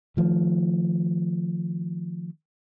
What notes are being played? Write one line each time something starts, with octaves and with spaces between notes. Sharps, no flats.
D#3 F3 A3